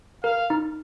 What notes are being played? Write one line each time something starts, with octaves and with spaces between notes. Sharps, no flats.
A#4 F5
D#4